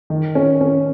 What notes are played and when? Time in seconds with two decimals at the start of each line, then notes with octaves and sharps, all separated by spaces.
0.10 D#3
0.35 C#4
0.61 C#4